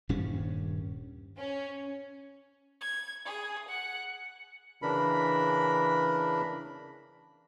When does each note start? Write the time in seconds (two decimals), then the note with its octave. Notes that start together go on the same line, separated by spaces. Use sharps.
0.09 D#1 G2 G3 C#4
1.37 C#4
2.79 G#6
3.25 G#4
3.68 F#5
4.82 C#3 E3 D4 A#4 B5